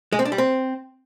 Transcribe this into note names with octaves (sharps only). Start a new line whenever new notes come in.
G#3
C4
D4
G3
C4